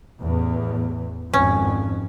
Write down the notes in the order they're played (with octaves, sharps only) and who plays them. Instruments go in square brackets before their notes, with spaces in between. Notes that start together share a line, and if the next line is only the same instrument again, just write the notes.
[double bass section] A1 E2
[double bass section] G#1 F2 [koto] C#4